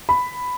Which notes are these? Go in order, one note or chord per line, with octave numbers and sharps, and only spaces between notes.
B5